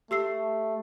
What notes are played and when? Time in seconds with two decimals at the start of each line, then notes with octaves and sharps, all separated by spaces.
0.11 A3 G4 E6 C7